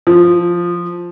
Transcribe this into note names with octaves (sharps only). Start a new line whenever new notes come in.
F3